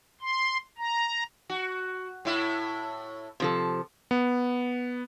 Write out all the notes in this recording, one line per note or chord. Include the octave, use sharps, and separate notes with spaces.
C6
A#5
F#4
A2 E4
C3 F3 A4
B3